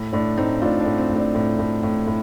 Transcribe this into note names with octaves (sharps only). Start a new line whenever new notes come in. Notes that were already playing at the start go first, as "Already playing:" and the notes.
Already playing: A2
A2 D4
A2 C4 D#4
A2 D4 F4
D4
A2
C4
A2
D4
A2
A2
A2
A2